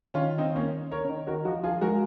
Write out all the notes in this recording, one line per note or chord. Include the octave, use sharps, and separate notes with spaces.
D#3 C#4 F4
C4 D#4
A#3 C#4
A#4 C#5
C#3
D#3
D#3 F#4 A#4
F3 D#4 F#4
F3 F4 G#4
G#3 F#4 A#4